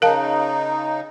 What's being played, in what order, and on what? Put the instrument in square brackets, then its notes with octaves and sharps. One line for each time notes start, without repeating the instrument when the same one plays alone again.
[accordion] C#3 D#4 [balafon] A#4 F5 A5